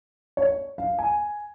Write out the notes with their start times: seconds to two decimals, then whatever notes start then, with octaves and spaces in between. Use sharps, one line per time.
0.37 C#5
0.78 F5
0.98 G#5